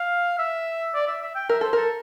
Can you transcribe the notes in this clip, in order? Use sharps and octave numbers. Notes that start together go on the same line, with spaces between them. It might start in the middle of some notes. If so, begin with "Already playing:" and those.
Already playing: F5
E5
D5
E5
E5
G5
A#4 E5
A4 C5
A4 A#4